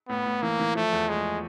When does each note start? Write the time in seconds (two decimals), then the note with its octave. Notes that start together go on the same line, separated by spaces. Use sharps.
0.09 A2 B3
0.26 A2
0.42 E3 A#3
0.60 E3
0.75 F3 A3
0.92 E2
1.09 G#3 A3